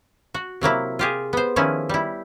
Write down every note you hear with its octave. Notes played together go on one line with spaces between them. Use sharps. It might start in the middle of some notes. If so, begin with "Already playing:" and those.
F#4
C3 F#3 A#3 E4
F4 G4 G#4
B3 C5
D#3 F3 C#4 E4
G3 E4